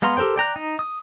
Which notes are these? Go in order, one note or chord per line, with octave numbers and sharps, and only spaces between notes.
G#3 B3 F5 A#5 C6
G4 A4 A#4 C5 G5
D5 G5 A#5 F#6
D#4
D#6